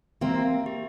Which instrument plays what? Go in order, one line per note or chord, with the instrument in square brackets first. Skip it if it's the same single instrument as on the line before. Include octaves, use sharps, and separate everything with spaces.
[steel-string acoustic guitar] A#3 C4 [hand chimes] E5
[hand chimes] G4